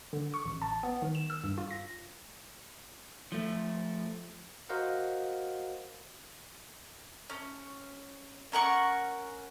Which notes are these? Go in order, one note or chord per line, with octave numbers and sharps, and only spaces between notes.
D3
C#6
A1
A5
B3
D#3
E7
E6
G2
F4
A#6
F3 A3
F#4 A#4 C5 D#5 F5 F#5
C#4
C#4 A#4 F#5 C#6